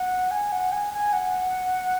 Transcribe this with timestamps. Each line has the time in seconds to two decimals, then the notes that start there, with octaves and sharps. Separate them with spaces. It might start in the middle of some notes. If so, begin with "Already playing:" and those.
Already playing: F#5
0.31 G#5
0.52 F#5
0.72 G#5
0.94 G#5
1.13 F#5